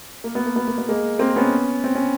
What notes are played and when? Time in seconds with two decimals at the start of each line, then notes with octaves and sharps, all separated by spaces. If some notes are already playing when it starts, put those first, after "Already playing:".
0.24 A#3
0.35 B3
0.46 A#3
0.56 B3
0.68 A#3
0.78 B3
0.89 G#3 A#3
1.19 A#3 C4
1.36 B3 C#4
1.84 C4
1.95 C#4